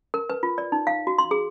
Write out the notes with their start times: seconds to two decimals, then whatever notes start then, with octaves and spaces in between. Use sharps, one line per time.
0.14 A#4
0.30 B4
0.43 F4
0.58 D5
0.72 D#4
0.87 F5
1.07 F#4
1.18 C6
1.31 G#4